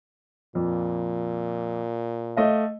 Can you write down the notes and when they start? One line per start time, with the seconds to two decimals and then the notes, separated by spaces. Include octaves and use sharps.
0.55 F2 A#2
2.37 A3 D#5 F5